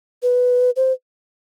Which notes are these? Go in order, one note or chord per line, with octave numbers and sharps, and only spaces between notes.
B4
C5